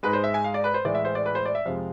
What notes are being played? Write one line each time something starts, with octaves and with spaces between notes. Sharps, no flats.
G#2 G#3 B4
C5
E5
G#5
F5
D5
B4
C5
A2 E3 G#3 D5
E5
C5
D5
B4
C5
D5
E5
F2 C3 F3 G#3 F5